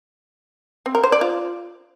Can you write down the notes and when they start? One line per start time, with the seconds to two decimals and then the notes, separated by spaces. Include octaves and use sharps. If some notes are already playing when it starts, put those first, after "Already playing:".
0.86 C4
0.95 A#4
1.03 C5
1.12 D5
1.21 F4